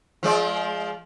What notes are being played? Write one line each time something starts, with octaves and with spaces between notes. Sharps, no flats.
F3 G#3 D5